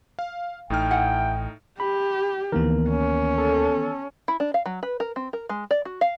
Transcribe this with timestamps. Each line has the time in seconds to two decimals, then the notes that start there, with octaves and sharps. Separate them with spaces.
0.19 F5
0.70 A1 A2 D#4 G5 F6
0.91 E4 F#5 G#5
1.80 G4 B5
2.52 D2 D#3 E3 A#3 B3 A#4
2.89 C#4
3.38 A4
4.28 E4
4.40 D4
4.54 F5
4.66 F#3
4.83 B4
5.00 A#4
5.16 C4
5.33 A#4
5.49 G#3
5.71 D5
5.85 F#4
6.01 F5